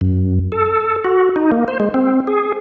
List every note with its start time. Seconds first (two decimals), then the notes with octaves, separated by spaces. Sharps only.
0.01 F#2
0.52 A4
1.04 F#4
1.36 D#4
1.52 A#3
1.68 C5
1.80 G#3
1.94 C4
2.27 G#4